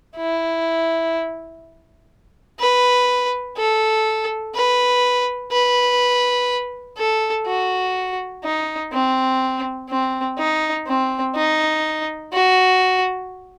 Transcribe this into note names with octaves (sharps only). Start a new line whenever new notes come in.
E4
B4
A4
B4
B4
A4
F#4
D#4
C4
C4
D#4
C4
D#4
F#4